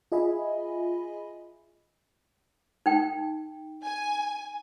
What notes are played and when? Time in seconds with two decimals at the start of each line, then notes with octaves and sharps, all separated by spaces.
0.12 F4 G#4 D#5 E5 G#5 B5
2.86 D#4 G5
3.84 G#5